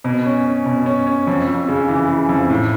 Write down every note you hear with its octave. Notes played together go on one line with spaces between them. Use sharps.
B2
C#4
C#4
B2
C#4
C#4
F2
F2
C#3
E3
C#3
F2
A2